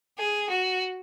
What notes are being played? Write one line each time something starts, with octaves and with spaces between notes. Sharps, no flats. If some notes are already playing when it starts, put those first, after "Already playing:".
G#4
F#4